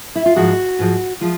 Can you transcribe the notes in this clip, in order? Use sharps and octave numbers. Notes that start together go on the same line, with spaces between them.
E4
F4
G#2 F3 G#3 F#4
G#2 F3 G#3
F3 G#3 F4